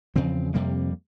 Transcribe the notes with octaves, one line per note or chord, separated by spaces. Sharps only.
E2 C#3 F3 C4
F2 C3 G3 A#3